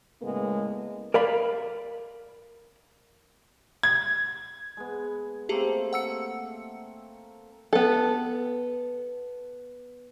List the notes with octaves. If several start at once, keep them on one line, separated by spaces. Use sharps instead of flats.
A2 C#3 G#3 A#3 B3
A#4 D5 F5 B5
G#6
G#3 B3
A3 A#3 C4 G4 G#4
F#5 E6 C#7
B3 A4